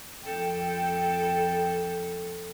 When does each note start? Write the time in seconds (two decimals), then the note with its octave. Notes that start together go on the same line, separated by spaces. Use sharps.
0.24 F2 A4 G5